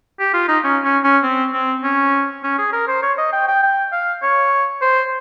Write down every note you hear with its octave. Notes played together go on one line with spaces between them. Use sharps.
G4
F4
D#4
C#4
C#4
C#4
C4
C4
C#4
C#4
G#4
A#4
C5
C#5
D#5
G5
G5
G5
F5
C#5
C5